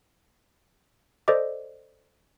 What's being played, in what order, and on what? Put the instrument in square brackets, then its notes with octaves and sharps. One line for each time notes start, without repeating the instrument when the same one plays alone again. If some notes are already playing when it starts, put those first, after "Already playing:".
[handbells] A4 C5 D5 D#5 D6